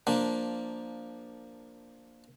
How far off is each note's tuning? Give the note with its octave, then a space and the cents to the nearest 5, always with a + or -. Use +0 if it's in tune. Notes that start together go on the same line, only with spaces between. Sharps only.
F3 +5 A#3 +0 D4 +0